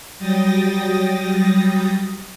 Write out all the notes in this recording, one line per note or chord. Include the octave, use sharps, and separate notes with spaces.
F#3 G3 G5 D#6 A6 A#6